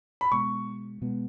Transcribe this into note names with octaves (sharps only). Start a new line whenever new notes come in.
B5
B2 G#3 B3 C#6
B2 G#3 B3